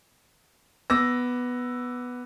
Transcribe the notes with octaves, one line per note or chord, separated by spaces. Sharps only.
B3 D6 E6 A#6